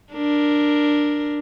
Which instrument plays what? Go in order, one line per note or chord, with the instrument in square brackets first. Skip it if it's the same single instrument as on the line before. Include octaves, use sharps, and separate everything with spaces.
[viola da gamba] D4 A#4